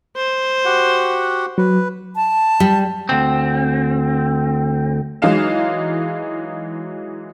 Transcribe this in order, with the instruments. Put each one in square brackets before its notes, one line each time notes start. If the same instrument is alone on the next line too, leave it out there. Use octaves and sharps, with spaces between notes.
[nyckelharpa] C5
[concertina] F#4 G4 F#5
[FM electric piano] F#3 [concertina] B4
[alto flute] A5
[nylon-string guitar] G3
[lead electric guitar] D2 C4
[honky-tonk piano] E3 F#3 G#3 D#4 F5 E7